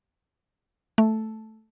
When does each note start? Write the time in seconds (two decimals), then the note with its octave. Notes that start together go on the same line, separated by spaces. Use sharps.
0.98 A3